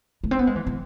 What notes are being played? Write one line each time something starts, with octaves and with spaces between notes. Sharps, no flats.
A3
C4
B3
G#3
E3
E3